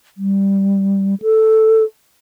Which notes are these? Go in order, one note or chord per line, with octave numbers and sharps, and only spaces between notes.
G3
A4